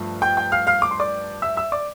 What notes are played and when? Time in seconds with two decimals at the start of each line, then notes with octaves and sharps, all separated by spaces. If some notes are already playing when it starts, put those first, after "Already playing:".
Already playing: G2 F3 A3
0.22 G5 G6
0.37 G5 G6
0.52 F5 F6
0.67 F5 F6
0.82 D6
0.91 C6
1.00 D5 D6
1.42 E5 E6
1.57 E5 E6
1.72 D5 D6